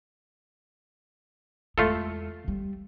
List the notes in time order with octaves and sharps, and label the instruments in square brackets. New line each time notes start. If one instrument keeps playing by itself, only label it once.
[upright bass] E2 G#3 [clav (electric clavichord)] A3 F4 A4
[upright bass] G3